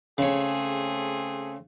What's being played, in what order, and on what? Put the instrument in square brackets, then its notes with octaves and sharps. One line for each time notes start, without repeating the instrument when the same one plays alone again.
[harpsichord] C#3 C#5 [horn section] A3 C4 G#4